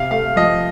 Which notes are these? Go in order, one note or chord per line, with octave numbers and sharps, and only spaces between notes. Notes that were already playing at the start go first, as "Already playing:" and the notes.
Already playing: C3 F5
A3 F5
F3 D#5